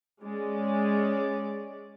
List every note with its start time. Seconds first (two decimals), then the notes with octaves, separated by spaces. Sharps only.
0.22 G#3 C#4 D5